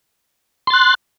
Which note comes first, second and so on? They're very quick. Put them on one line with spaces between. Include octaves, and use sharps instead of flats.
C6 A6 F#6